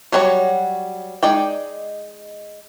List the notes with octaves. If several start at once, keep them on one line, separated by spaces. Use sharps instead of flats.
F#3 G3 F#4 A4 C#5
G#3 D#4 D5 G5